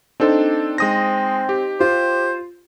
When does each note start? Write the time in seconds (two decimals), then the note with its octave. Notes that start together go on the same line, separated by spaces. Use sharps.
0.20 C4 D4 D#4 A4 C5
0.78 G#3 C4 D#6 A#6
1.49 G4
1.80 F4 C5